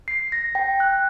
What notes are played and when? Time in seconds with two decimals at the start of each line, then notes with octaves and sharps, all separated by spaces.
0.08 C7
0.32 A#6
0.55 G5
0.80 F#6